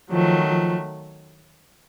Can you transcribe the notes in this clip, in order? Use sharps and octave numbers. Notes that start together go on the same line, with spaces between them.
D#3 F3 F#3 A3
F3